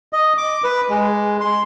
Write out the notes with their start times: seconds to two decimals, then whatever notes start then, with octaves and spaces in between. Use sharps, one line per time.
0.13 D#5
0.38 D6
0.64 B4
0.89 G#3
1.41 C6